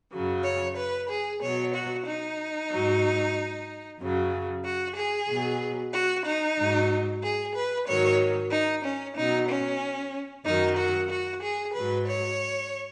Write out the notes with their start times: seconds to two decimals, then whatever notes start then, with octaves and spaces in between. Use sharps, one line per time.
0.12 F#2 C#3 F#3
0.44 C#5
0.77 B4
1.10 G#4
1.42 B2 F#3 C#5
1.74 F#4
2.05 D#4
2.70 G#2 F#3
3.99 F#2 C#3 F#3
4.65 F#4
4.96 G#4
5.28 B2 F#3
5.93 F#4
6.26 D#4
6.58 G#2 F#3
7.22 G#4
7.55 B4
7.87 G#2 D#3 F#3 C#5
8.52 D#4
8.84 C#4
9.17 B2 F#3 D#4
9.49 C#4
10.45 F#2 D#3 F#3 D#4
10.77 F#4
11.10 F#4
11.43 G#4
11.74 G#2 F#3 B4
12.07 C#5